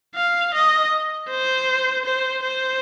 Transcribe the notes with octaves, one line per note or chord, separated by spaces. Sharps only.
F5
D#5
C5
C5
C5